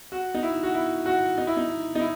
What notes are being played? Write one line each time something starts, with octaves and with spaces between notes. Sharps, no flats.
F#4
D#4
E4
F#4
E4
F#4
D#4
E4
D#4
D#4
E4